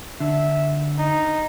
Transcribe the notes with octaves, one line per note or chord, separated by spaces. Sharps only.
D3 E5
D#4